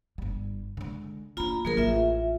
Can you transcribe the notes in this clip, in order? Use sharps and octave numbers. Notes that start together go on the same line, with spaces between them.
G1 G3
D3 G#3
A#3 D4 F4 A#5 B5
D#3 F#3 A#3 G#4 A#4
A1 F4 E5